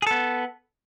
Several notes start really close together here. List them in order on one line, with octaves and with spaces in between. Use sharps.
G#4 A4 B3